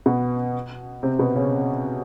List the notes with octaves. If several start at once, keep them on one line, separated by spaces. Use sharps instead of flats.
B2 B3
C3 C4
B2 B3
C#3 C#4